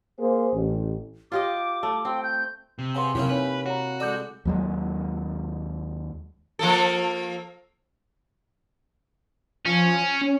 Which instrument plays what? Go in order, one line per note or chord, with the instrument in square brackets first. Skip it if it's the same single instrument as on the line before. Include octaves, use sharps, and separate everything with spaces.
[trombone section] A#3 G#4 C5
A1
[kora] F4 G4 D#5 [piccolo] D6
[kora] A3
[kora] C4 [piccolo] G5
[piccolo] G6
[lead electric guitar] C3
[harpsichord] C#3 B3 [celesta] G#5 C6
[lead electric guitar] F#2 [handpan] C3 E4 [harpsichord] A#3 C#4 G4
[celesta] D#4 C#5 G#5 [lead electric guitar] B4
[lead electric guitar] F#4 [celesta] C#5 A#5
[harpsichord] G#3 A4 [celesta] D5 D6 G6
[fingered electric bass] D#2 F#3 G#3
[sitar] F3 A#3 A4
[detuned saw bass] F3 [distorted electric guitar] C#4
[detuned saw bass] C#4